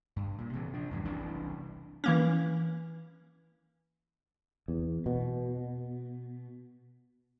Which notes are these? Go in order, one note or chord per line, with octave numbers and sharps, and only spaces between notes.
G2
A#2
C3 E3
F3 D4
E2 G#2 E3
F#1 C2 E3 D4
E3 A#3 C#4
E2
B2